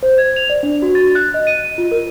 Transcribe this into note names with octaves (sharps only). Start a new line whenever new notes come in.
C5
G#6
F7
D5
D4
F#4
A6
F#6
D#5
D#7
F4
A#4